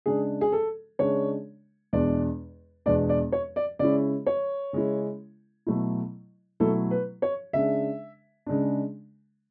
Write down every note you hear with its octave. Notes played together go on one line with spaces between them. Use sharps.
C#3 G#3 D4 G#4
G#4
A4
C#3 G#3 D4 C#5
E2 B2 G#3 D4 D5
E2 B2 G#3 D4 D5
D5
C#5
D5
C#3 G#3 C#4 E4 D5
C#5
C#3 G#3 C#4 E4
B2 F#3 A3 E4
B2 F#3 A3 E4 A4
B4
C#5
C#3 G#3 D4 E5
C#3 G#3 D4